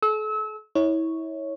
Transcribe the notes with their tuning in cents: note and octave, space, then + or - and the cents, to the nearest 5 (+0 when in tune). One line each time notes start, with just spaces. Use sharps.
A4 -40 E6 -30
E4 -30 C#5 +0